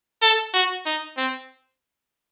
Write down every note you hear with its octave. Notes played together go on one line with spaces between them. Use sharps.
A4
F#4
D#4
C4